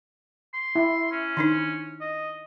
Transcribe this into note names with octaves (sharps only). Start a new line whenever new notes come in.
C6
E4
C#4
D#3 D4 D#4
D#5